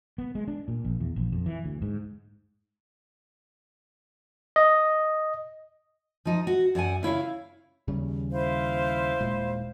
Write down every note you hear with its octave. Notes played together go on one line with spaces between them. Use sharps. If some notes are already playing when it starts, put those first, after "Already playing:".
B3
G#3
D4
A#2
A#1
E2
A#1
F2
E3
D2
G#2
D#5
F3 D#4
F#4
F#2 D5 F#5 G#5
C#3 E4 C#5 F5
D#2 C#3 G3
E4 C5 F5
D#1 A#2 G#3